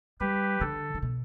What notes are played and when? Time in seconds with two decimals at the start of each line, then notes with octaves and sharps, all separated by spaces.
0.20 G3 G4 B4
0.61 D3 A4
0.95 D3
1.02 B2